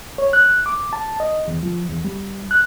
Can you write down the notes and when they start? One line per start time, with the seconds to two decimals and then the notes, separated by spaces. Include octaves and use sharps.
0.18 C#5
0.33 F#6
0.66 D6
0.93 A5
1.20 D#5
1.48 E2
1.63 F3
1.89 E2
2.04 G3
2.51 F#6